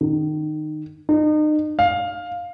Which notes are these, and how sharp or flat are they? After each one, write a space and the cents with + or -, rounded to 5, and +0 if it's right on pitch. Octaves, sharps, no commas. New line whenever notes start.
D#3 -20
D#4 -35
F5 +10